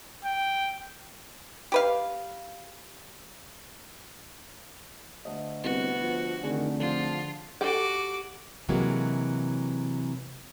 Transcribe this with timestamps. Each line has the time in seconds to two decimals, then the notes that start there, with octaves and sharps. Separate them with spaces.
0.25 G5
1.72 G4 B4 F5
5.25 D2 D#5
5.64 C2 B3 F#4
6.02 F3
6.43 F1 D3 D#3 G#4 C#6
6.80 F3 F4 A4 D5 F#5
7.61 F#4 G4 A4 D6
8.69 C3 E3 F#3 G#3 A#3